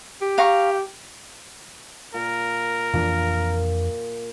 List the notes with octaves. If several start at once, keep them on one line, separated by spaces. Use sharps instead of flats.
G4
F5 A#5 C#6
A#2 A#4
F2 A#2 E3 D4